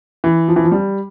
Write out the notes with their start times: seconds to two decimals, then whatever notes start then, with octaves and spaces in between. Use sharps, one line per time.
0.24 E3
0.48 F3
0.56 E3
0.64 F3
0.72 G3